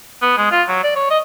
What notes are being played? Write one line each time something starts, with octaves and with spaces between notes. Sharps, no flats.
B3
G#3
F4
F#3
D5
C#5
D#5